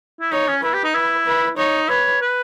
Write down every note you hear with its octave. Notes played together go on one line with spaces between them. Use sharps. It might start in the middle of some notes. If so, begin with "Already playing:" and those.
E4
D#4 C#5
C#4
E4 B4
G4
D#4
E4 B4
B4
D#4 C#5
B4 C#5
B4